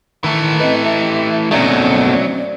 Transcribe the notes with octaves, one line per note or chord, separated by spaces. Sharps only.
D#3 E3 A3 C#6
C4 B4 D#5
G4 D#5 E5 A5
B2 F#3 A3 C4 C#4 D#4 D5